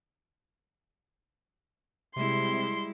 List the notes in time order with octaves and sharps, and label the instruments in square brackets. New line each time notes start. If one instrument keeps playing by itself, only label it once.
[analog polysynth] C3 [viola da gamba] G3 G#3 E4 [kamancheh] C6